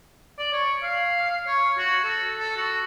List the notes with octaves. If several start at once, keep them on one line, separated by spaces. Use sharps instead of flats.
D5
C#5
F5
C#5
F#4
A4
A4
F#4